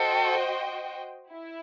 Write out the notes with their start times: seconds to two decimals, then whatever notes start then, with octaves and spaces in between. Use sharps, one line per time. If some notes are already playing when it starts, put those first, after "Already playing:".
Already playing: F#4 A4 C5 D#5 G5
1.31 E4